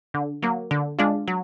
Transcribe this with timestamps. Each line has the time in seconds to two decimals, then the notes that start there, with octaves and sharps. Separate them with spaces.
0.14 D3
0.43 F#3 A#3
0.71 D3
0.99 G#3 D4 F4
1.28 F#3